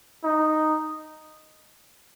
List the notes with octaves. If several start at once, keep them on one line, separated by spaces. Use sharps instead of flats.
D#4